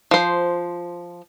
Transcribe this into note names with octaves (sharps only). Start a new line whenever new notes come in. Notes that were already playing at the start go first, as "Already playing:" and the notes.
F3 C5